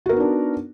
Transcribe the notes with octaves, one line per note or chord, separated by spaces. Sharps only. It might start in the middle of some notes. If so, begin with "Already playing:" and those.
B3 D4 D#4 F#4 A#4